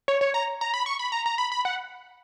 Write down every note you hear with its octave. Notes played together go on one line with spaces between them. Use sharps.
C#5
C#5
A#5
A#5
B5
C#6
B5
A#5
A#5
B5
B5
F#5